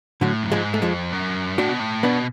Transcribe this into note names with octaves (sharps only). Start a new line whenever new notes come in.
A2 D3 F#3
F#2
G#2 F3 G#3
A3
F2 F3 G#3
F#2
A2 D4 F#4
B2
A2
B2 B3 D4